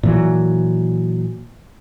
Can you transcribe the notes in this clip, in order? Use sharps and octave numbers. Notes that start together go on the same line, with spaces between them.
A#2 E3 F#3